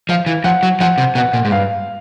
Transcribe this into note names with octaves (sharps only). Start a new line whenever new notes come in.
F3 F5
E3
F3 F#5
F#3
F3 F#5
C3
B2 F#5
A#2
G#2
G2 F5